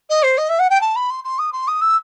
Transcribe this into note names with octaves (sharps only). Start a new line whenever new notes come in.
D#5
C5
D#5
E5
F#5
G5
A5
B5
C6
C6
D#6
C6
D#6
E6